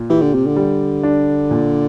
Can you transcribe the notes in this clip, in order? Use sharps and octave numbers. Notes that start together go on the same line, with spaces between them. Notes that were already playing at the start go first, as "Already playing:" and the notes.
Already playing: A#2
E3 G4
D3
C3
D3
G3
D4
A#2